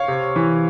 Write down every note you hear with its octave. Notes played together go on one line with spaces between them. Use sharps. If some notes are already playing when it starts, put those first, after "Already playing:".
Already playing: C#5 F5
C3
E3